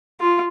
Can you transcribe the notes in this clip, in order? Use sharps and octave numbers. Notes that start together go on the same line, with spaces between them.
F4